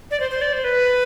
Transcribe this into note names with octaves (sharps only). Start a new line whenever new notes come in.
D5
C5
C5
D5
C5
B4